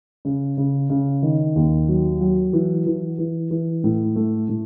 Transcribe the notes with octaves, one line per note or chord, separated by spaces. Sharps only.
C#3
C#3
C#3
D#3
D#2
F#3
F#3
E3
E3
E3
E3
A2
A3
A2